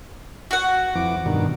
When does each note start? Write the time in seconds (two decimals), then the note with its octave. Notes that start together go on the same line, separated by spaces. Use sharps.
0.51 F#4 F#5
0.95 F2 E3 D6
1.26 G2 B2 D#3